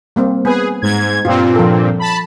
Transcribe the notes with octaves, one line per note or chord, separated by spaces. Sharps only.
G3 A#3 C4
B3 G#4 B4
G#2 G#6
G2 A#2 C4 F4
F3 A4
A5 B5